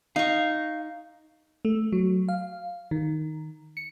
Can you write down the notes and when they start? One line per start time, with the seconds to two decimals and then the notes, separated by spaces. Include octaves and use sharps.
0.16 D#4 F5 C#6
1.65 A3
1.92 F#3
2.29 F5
2.91 D#3
3.77 C#7